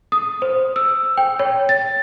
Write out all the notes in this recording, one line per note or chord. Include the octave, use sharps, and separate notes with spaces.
D#6
C5
E6
G5
C#5
A6